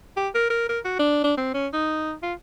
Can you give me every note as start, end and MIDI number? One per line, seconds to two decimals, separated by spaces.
0.17 0.29 67
0.35 0.48 70
0.50 0.68 70
0.69 0.79 70
0.85 0.96 66
0.99 1.20 62
1.24 1.34 62
1.37 1.51 60
1.54 1.67 61
1.73 2.13 63
2.23 2.34 65